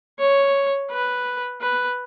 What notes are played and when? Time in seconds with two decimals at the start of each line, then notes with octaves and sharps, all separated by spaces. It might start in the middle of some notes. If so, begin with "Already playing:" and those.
0.19 C#5
0.90 B4
1.62 B4